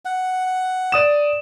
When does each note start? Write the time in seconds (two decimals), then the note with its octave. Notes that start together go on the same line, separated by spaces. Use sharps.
0.05 F#5
0.92 D5 D#6 E7